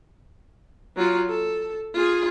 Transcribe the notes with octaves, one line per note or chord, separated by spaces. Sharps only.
F#3 F4
A4
F4 G#4